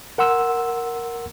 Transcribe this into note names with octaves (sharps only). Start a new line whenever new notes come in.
A#4 F#5 C6 E6